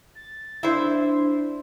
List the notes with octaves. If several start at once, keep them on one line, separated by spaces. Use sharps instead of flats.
A6
D4 E4 C5